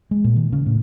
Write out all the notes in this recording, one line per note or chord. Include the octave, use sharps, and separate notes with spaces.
G#3
A#2
D#3
C#3
A2